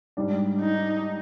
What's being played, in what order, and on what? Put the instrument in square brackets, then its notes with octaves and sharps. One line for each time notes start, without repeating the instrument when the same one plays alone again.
[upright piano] G#2 G3 D4
[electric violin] D#4